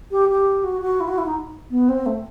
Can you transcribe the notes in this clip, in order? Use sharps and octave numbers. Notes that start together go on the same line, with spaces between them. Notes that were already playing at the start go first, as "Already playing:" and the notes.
G4
G4
F#4
F#4
E4
F#4
E4
D#4
B3
C4
A3